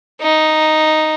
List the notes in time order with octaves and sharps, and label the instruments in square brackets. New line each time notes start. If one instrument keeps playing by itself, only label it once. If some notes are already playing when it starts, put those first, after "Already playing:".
[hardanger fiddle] D#4